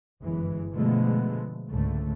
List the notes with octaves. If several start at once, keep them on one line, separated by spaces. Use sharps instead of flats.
G1 F#2 E3 G#3
B2 D3 F3 G#3 A3 B3
C#2 G#2 D3 A3